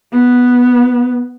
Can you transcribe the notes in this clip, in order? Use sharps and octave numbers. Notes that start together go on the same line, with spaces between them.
B3